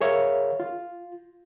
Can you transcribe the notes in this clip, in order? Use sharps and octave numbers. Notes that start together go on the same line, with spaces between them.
G#4 A#4 C#5 E5 F5
F4